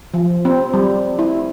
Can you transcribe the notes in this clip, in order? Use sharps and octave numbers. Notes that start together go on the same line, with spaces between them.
F3
C4
G3
E4